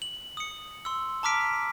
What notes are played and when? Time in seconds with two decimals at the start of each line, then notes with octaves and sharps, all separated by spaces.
0.02 F#7
0.37 D#6 C#7
0.85 C6 E6
1.23 A5 A#5 D6 F6 B6 D7